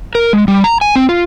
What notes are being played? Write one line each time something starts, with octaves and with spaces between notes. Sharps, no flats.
A#4
G#3
G3
A#5
G#5
C4
F4